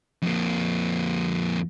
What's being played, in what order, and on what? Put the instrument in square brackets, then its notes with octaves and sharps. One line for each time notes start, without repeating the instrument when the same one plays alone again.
[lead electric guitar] F2 A#3